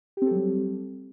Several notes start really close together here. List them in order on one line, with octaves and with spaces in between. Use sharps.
G4 C4 A4 F#3 G3